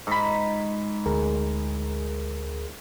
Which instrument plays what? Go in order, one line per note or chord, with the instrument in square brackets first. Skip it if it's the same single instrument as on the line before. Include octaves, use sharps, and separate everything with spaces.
[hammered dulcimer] G#2 B5
[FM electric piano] D2 G#4 A#4